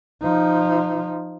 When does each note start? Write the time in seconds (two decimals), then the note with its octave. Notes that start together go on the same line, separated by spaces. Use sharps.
0.22 F3 D#4